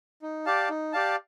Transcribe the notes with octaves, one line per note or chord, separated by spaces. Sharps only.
D#4
G4 D5 F5 A5
D#4
G4 D5 F5 A5